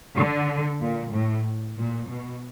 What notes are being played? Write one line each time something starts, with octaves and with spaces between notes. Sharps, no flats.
D3
A#2
A2
A#2
B2